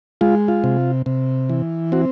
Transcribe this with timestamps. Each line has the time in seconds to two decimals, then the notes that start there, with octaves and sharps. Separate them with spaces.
0.21 G#3 F4
0.48 F4
0.64 C3
1.06 C3
1.49 E3
1.92 C4 F#4